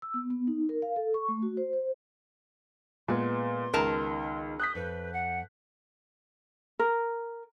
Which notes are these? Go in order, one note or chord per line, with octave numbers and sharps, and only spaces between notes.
E6
B3
B3
D#4
A#4
F5
A4
C#6
A3
F#4
C5
C5
A#2 G#3 B3 C6
C#2 D#3 A#4 A5
D#6 F#6 G6 B6
F2 B4
F#5
A#4